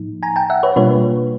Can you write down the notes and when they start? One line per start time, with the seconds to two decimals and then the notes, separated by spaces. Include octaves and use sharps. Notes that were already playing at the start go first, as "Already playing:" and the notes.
Already playing: A2 F3 A#3 D#4
0.23 G#5 A#5
0.36 G5 A5
0.50 E5 F#5
0.63 B4 C#5
0.76 B2 G3 A#3 D4 F4 B4 C#5